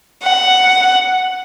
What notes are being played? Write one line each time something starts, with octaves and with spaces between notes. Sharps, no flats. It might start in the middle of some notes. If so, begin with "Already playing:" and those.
F#5